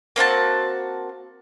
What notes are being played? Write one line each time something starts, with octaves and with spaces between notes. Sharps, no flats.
A#3 C4 F#4 A5